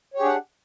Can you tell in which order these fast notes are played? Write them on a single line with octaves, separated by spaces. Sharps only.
C#5 G4 G#4 D4 F#5